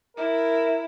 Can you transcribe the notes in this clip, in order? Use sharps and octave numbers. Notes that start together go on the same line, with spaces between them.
E4 A#4